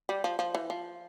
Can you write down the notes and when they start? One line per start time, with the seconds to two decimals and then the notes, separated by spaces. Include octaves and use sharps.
0.09 G3
0.24 F3
0.39 F3
0.55 E3
0.70 F3